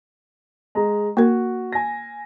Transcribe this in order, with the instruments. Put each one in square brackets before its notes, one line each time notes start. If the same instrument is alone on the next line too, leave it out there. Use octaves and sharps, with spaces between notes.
[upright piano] G#3 A#5
[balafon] A#3 A#4 [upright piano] F#4
[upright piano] G#5 A#6